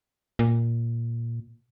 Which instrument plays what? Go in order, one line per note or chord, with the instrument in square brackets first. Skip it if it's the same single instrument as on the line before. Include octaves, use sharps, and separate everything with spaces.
[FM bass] A#2